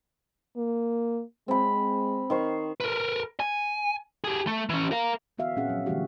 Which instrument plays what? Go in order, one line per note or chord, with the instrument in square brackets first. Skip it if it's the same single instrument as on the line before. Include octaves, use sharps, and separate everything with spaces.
[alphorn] A#3
[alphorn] G#3 [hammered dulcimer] C4 B5
[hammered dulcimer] D#3 C5 C#6
[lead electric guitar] A#4 B4
G#5
G4 G#4
A3
E3 C#4
A#4 F5
[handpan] D3 E3 B3 F#4 E5 F5
A#2 C4 C#4 G#4 F#5
F3 F#3
D3 E3 G3 A3 F#4 G4